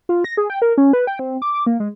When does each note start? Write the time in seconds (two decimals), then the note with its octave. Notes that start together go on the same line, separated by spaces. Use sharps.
0.09 F4
0.24 A#6
0.37 G#4
0.50 G5
0.62 A#4
0.78 C#4
0.93 B4
1.07 G5
1.19 C4
1.42 D6
1.66 A#3
1.80 G#3